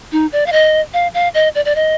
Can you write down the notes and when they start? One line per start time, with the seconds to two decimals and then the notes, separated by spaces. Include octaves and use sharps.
0.12 D#4
0.32 D5
0.46 F5
0.52 D#5
0.94 F5
1.14 F5
1.34 D#5
1.55 D5
1.65 D5
1.75 D#5